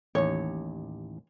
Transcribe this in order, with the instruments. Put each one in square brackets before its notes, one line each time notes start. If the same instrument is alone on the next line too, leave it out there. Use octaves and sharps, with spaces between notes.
[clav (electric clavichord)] A1 D#2 [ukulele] C#5